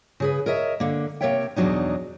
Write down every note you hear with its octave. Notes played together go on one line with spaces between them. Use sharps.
C#3 G#4 B4
A#4 C#5 D#5 E5
D3 A#3
C3 A#3 A#4 C#5 E5 G5
E2 B2 F3 F#3 D4 D#4